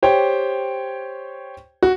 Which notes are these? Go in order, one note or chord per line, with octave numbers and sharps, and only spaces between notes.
G4 C5 C#5 G5
F#4